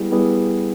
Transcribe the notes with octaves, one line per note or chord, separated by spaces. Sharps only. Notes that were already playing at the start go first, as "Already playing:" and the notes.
Already playing: G3 B3 E4 G#4
G3 B3 E4 G#4